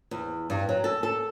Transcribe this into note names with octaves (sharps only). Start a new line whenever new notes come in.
E2
G2
F#3
A4
A4